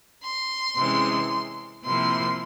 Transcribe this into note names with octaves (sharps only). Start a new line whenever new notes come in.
C6
C3 E3 G#3 C#4
C3 F3 A#3 E4 C6